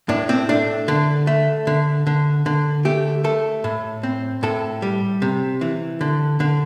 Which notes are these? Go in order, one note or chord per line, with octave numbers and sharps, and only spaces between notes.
A2 D4
C4
A3 D4
D3
A3
D3
D3
D3
A3 G4
A3 A4
A2
C4
A2 A4
G3
C3
E3
D3
D3